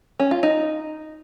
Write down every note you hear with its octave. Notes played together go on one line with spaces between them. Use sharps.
C#4
F4
D#4